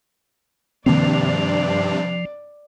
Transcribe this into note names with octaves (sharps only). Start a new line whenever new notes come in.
G2 C3 D#3 F3 A#3 C4 D4 D5